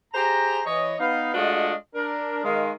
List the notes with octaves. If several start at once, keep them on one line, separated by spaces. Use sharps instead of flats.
G4 G#4 C5 A#5
E3 C#5 D#5
B3 D#4 F5
G#3 A3 D4 F4 F#4 D#5
D4 A#4
D#3 G#3 F5